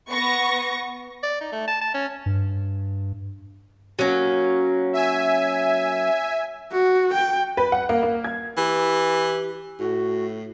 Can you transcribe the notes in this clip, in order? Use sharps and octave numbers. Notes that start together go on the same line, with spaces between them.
B3 C#6 A#6
D5
D#4
A3
A5
A5
C#4
G2
F#3 A#3 C#4
E5 G#5
F#4
G5
B4
F#5
A#3
A#3
G#6
E3 G4
A2 F#4